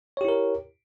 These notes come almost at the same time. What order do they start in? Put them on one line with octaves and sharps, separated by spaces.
C#5 G4 E4 A#4